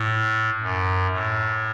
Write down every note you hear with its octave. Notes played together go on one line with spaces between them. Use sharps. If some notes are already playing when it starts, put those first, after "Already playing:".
Already playing: A2
F#2
A2